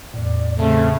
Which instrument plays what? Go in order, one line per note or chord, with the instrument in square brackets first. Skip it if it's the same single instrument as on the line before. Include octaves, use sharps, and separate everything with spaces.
[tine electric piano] E2 A2 [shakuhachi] D5
[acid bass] C#3 [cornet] A3 [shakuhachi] C4